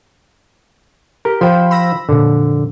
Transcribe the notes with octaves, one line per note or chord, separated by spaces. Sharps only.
G4 A#4
F3 C5 G5 B5
B5 E6 A#6
F2 A#2 D3